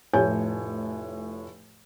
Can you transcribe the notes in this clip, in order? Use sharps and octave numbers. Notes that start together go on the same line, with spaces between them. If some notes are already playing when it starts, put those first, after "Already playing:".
F1 A2 C#5 G#5 G6